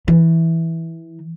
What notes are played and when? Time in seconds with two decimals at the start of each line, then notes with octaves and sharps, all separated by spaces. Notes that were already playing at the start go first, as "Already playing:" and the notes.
0.08 E3